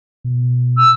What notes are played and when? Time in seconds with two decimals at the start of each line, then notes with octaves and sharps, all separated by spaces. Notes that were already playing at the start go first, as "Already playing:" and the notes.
0.24 B2
0.77 E6